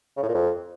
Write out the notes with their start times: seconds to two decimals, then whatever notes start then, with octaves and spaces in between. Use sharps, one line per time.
0.17 C#3
0.23 A2
0.29 A#2
0.35 F2